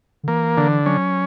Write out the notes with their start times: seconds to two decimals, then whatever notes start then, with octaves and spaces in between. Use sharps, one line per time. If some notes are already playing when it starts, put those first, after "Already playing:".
0.23 D3
0.28 E3 A#3
0.57 D3
0.86 F#3 C#4